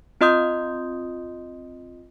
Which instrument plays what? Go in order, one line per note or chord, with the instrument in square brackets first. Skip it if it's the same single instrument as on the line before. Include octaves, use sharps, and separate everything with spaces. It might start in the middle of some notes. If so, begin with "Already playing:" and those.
[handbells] C4 F4 D#5 C6 D#6 G6